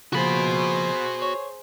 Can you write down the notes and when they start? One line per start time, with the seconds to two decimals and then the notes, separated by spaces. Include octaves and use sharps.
0.13 C#3 F3 A#3 F#4 G#4 C5 B5
1.22 C#5